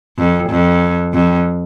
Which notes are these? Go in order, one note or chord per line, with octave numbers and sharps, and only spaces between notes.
F2
F2
F2